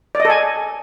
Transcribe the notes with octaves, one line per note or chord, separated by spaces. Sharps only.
D5
D#5
A4
G#5